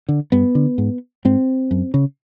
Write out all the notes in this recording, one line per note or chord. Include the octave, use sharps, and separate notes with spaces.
D3
G2 B3
D3
G#2
G#2 C4
F#2
C#3